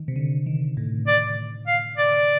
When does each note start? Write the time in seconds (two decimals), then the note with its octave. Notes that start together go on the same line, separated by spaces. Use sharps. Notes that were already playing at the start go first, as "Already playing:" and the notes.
Already playing: D#3
0.08 C3
0.16 D3
0.46 D#3
0.77 A2
1.07 D5
1.68 F5
1.98 D5